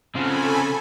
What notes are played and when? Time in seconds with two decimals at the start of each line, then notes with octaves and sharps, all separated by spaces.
0.15 C#3 C4 F4 F#4 A4 G#5 B5